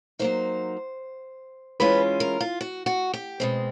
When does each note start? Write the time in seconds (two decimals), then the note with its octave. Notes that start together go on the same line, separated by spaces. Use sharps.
0.19 F#3 A#3 D#4 C5
1.80 E3 G#3 C#4 F4 B4
2.20 A#4
2.41 F4
2.61 F#4
2.86 F#4
3.14 G4
3.40 B2 G#3 C4